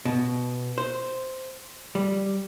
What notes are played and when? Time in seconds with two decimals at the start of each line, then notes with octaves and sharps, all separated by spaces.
0.05 B2
0.78 C5
1.95 G3